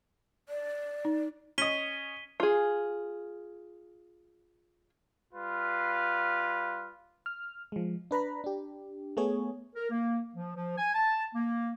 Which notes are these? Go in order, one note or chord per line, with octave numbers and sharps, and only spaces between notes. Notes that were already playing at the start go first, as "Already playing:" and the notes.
D5
D#4
C#4 D#5 B6 D#7 G7
F4 G#4
G3 F4 B4 F5
F6
F3 G#3
D4 B4 A#5 B5
D4 G4
A3 B3 G#4 C#5
A#4
A#3
F3
F3
G#5
A5
A#3